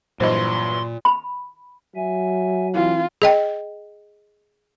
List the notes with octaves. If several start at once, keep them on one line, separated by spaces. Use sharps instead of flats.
G2 A#2 E3 F#3 C5 D#5 C6
B5
F#3 E5 G#5
E3 C4 F4
G#4 D#5 G5